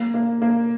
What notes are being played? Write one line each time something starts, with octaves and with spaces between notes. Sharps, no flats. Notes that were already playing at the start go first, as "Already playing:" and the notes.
Already playing: A#3
A#3
A#3